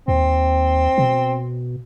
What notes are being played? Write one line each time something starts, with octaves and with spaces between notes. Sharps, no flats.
D#2 C4
B2